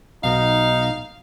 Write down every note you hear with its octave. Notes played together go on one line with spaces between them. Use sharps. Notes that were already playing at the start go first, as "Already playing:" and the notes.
B1 B2 D#4 F5